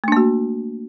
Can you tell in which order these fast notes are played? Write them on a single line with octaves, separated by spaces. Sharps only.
A3 D4 A#3 F#4